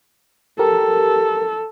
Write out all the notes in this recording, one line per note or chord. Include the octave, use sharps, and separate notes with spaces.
G4 A4 A#4